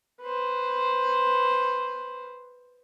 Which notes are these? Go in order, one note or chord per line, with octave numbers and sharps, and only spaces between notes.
B4 C5